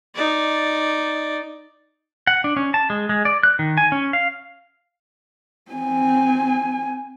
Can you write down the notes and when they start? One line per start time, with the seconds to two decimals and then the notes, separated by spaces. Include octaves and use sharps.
0.15 D#4 D5
2.27 F#5
2.44 D4
2.57 C#4
2.74 A5
2.90 G#3
3.09 G#3
3.25 D5
3.43 F#6
3.59 D#3
3.77 G#5
3.92 C#4
4.13 F5
5.71 C4 G#5